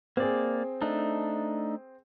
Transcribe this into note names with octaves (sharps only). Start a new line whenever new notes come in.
A#3 C4 G#4 D5
A3 D4 D#4